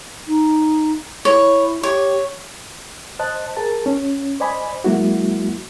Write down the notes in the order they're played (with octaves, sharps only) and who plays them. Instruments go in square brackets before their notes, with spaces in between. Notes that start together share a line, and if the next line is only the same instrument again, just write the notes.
[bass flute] D#4
[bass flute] E4 [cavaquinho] C#5
[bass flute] G4 [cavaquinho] C#5
[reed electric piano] C5 D#5 A5 F#6
G#4 A#4 A5
C#4
C5 D5 D#5 G#5 B5
F#3 G#3 A#3 E4 F#4